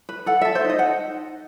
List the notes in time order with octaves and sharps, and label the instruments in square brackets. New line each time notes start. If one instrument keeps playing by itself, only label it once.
[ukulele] B4
A4 F#5
A4 E5
C5
D#4 D#5
F#5